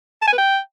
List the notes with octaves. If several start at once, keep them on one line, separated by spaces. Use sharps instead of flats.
A5
G#5
B4
G5